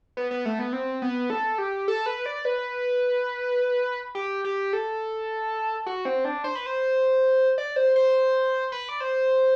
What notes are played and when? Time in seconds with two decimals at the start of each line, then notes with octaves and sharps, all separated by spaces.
0.17 B3
0.31 B3
0.45 A3
0.59 B3
0.73 C4
1.02 B3
1.30 A4
1.58 G4
1.88 A4
2.06 B4
2.26 D5
2.45 B4
4.15 G4
4.45 G4
4.73 A4
5.86 F#4
6.05 C4
6.25 D4
6.44 C5
6.55 B4
6.66 C5
7.58 D5
7.76 C5
7.96 C5
8.72 B4
8.89 D5
9.01 C5